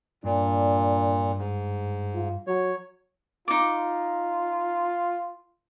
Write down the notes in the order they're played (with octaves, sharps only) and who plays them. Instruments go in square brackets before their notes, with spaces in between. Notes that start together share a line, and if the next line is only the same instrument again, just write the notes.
[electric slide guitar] G2 [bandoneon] A#2 [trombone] D4
[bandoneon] G#2
[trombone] F4
[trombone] F#3 [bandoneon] C#5
[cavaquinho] D#4 D6 [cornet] F4